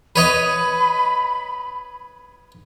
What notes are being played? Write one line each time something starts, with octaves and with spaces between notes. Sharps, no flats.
B4 C#5 D#5 B5